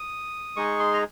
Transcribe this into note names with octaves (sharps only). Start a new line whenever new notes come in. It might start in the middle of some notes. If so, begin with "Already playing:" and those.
Already playing: D#6
G#3 D#4 G#4 C#6
C6
A#5